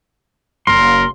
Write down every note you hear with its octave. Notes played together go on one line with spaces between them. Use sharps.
F#1 A#4 C6